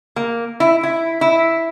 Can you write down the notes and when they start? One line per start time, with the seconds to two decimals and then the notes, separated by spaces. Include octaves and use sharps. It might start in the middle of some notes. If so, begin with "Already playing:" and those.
0.16 A#3
0.60 E4
0.83 E4
1.21 E4